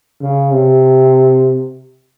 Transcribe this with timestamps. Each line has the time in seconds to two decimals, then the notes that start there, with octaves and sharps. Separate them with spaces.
0.21 C#3
0.52 C3